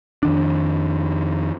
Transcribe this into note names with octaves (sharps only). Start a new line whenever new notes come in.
F2 D#3 D4